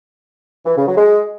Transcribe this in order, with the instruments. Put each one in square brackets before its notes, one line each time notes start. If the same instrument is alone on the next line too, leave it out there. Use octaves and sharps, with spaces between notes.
[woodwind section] E3
C#3
F#3
G#3